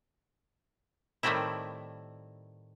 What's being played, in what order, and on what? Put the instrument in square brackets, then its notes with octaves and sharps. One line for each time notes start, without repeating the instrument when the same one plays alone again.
[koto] A2 D#3 G3 A3 C4 E4